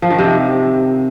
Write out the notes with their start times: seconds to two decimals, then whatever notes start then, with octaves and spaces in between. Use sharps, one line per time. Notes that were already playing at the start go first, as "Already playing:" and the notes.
0.02 F3
0.10 D#3
0.19 C3